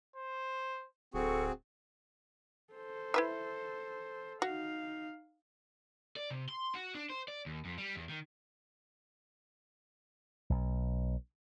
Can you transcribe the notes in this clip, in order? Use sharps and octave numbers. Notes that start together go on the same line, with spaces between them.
C5
D1 C4 F#4 G#4 A4 C#6
A4 C5
E4 B4 E5
D#4 F#4 F5
D5
C3
C6
F#4
D4
C5
D5
D#2
F2
G3
E2
D#3
B1